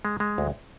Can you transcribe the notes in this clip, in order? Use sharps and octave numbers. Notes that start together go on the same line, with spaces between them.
G#3
G#3
D2